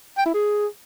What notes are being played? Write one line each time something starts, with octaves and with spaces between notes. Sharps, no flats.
G5
E4
G#4